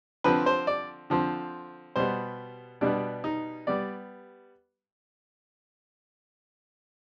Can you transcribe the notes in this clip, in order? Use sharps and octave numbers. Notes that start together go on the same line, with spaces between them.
D3 F3 C4 B4
C5
D5
D3 F3 C4
B2 G3 B3 C5
B2 G3 B3 D4
D#4
G3 B3 D5